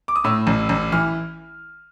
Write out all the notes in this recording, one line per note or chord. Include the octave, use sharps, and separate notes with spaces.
D6
D#6
A2 E6
A1
A1
E3 F6